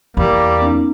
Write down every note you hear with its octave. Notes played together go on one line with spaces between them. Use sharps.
E2 G3 A#3 B5
B3 C#4 D#4